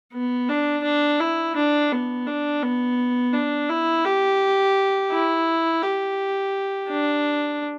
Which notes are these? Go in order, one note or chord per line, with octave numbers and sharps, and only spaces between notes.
B3
D4
D4
E4
D4
B3
D4
B3
D4
E4
G4
E4
G4
D4